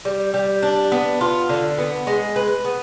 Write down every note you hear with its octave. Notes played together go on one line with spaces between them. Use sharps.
G3
G3
D4
B3
F4
D3
B3
G#3
B4
B3